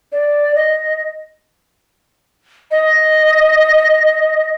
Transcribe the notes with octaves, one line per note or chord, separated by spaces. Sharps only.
D5
D#5
D#5